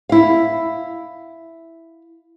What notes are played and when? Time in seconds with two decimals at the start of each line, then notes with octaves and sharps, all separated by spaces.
0.09 E4 F5